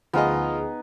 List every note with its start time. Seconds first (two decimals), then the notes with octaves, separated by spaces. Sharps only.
0.13 D2 F3 B3 D#4 F4 G#4 D#5 G#5